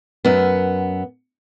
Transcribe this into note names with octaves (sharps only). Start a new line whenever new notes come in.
F#2 B3